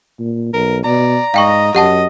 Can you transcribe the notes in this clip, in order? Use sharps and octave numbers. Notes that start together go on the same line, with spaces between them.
A#2
B1 A#4
B2 D5 A#5
G#2 D#5 F5 G5 C#6
F#2 G4 D#5 F#5 A5